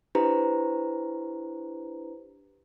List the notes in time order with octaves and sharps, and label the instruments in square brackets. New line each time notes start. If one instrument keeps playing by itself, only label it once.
[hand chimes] D4 E4 G4 B4 C5 A#5